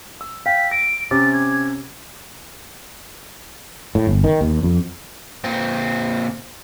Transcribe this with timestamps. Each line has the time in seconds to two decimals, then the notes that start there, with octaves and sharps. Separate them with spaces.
0.21 E6
0.46 F5 G5 B6
0.71 A#6 D7
1.11 C3 C#4 D6 A6
1.33 G#6
3.95 A2
4.07 G1
4.24 D#3
4.41 D#2
4.63 F2
5.44 A#2 C4